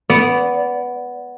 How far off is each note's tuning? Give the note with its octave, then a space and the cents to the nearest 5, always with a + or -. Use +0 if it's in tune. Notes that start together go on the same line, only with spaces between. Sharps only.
B3 +0 D5 -25